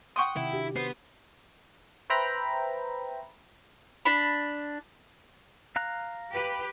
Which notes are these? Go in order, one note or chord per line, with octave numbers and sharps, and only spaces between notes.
F#5 G5 C6 C#6 D#6
C3 D#3 E4
D4 F#4 G4
B3 B4 C5
B4 C5 E5 G5 A#5 B5
D4 B5
F5 A#5 F#6
G4 B4